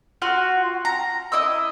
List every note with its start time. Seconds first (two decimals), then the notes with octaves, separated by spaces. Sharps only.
0.22 F4 F#4 F#5
0.85 A#5
1.32 E4 D#5 D#6 E6